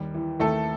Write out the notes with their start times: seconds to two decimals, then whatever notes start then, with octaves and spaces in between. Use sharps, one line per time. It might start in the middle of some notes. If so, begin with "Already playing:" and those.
Already playing: D#2 G3
0.14 E3
0.40 D#2 A3 A4